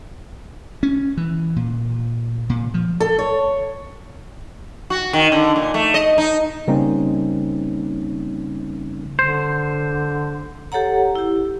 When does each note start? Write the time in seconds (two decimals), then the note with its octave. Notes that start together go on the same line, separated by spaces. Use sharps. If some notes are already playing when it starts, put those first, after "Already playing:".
0.83 C#4
1.17 E3
1.56 A#2
2.49 A#2
2.74 F3
3.00 A4
3.19 C#5
4.90 F#4
5.13 D#3
5.32 D3
5.56 A#2
5.74 A3
5.94 D#5
6.18 D#4
6.67 C#3 G3 A#3 C4 C#4 D#4
9.19 D3 C5
10.72 G4 A4 C#5 F#5 A#5
11.15 E4 G4